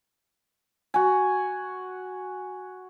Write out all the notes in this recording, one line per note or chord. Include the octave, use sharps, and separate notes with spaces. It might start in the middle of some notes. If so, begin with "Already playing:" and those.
F#4 G#5